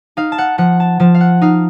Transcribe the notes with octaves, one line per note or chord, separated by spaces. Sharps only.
D#4 F5
A5
F#5
F3 F#5
A5
F3 A5
F5
F#5
D#4 F5